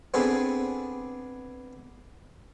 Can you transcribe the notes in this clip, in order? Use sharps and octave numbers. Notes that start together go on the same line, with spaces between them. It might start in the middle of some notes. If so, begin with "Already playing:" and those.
B3 C4 D4 G#4 A4 B4